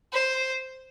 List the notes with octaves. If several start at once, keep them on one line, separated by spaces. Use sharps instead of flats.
C5